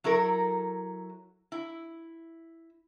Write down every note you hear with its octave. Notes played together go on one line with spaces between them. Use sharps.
F#3 E4 A4 A#4
E4